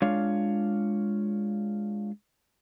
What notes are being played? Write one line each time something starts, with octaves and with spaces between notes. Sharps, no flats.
G#3 D4 F4 C#5 F5